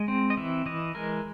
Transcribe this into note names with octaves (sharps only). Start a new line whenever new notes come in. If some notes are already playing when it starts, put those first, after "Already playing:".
Already playing: G#3 D#5
C4
D#5
E3 E5
E3 D#5
G#3 A#4